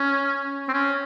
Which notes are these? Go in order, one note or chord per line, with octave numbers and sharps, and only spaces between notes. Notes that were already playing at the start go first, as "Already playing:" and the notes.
Already playing: C#4
C4
C#4